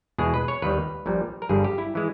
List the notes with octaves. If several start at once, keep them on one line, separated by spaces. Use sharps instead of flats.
E2 B2 G#3 G#4
B4
C#5
D#2 D#3 G3 B4
A#1 A#2 G3
A#4
G1 G2 G3 G#4
G4
E4
E3 G#3